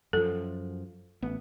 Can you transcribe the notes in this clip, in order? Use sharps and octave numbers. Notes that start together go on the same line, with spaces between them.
F#2 F3 A4
A1 B3